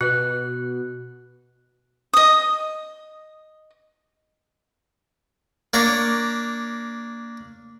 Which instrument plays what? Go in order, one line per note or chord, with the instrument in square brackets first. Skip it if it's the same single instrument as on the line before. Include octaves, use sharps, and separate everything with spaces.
[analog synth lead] B2 [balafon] F#4 B4 [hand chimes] F#6
[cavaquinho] D#5 D#6
[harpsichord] A#3 D4 C#5 A#5